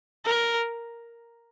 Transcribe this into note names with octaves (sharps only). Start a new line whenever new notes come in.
A#4